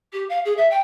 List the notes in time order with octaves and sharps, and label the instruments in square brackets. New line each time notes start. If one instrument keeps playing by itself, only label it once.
[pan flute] G4
F5
G#4
E5
G5